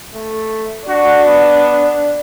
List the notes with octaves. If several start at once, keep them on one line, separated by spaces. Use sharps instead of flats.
A3
D4 F#4
B3